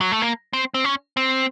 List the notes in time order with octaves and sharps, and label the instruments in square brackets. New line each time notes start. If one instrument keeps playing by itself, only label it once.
[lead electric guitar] F#3
A3
A#3
C4
C4
C#4
C4